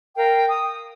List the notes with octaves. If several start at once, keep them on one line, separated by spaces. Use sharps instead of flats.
A#4 F5 G5
D#6